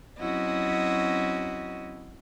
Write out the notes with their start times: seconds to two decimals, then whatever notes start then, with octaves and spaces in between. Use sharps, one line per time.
0.18 F#3 C4 C#4 E4 F#4 D#5